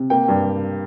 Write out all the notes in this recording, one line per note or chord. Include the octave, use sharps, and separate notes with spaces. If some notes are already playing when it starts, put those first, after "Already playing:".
Already playing: C3
A#3 G5
G2